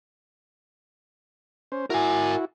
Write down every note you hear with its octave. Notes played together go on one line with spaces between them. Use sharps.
C#4 C5
E4 F#4 A#4 G#5